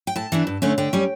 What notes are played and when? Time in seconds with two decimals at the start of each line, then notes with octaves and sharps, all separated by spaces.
0.07 G5
0.16 A2 A5
0.32 E3 B3 D4
0.47 G2
0.62 D3 A3 C#4
0.78 D3 G5
0.93 G3 C#4